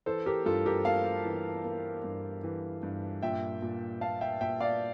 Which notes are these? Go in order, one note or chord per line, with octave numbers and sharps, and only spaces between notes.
E3 A4 C5
G4 A#4
G2 F4 A4
G4 A#4
A#3 F5 A5
E3
A#3
G2
E3
G2
A#2 E5 G5
A#2
A#2 F5 A5
E5 G5
A#2 E5 G5
D5 F5